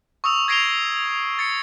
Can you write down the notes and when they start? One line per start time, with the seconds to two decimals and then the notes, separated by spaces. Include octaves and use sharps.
0.24 C#6 D#6 E6 F7
0.48 G#6 A#6 C7 D7 F7 G7
1.39 A6 C#7